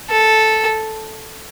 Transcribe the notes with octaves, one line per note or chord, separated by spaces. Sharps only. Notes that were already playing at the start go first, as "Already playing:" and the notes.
A4